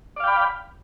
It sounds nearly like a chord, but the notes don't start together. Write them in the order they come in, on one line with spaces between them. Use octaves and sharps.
D5 F5 G5 B5